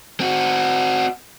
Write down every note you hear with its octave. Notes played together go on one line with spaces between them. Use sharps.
C4 F#4